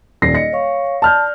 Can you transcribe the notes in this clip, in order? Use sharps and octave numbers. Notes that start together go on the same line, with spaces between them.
D#1 D#4 D5 A#6 C7
D#5 A#6 C#7
C#5 F5 C#6
D5 A5 F6 G6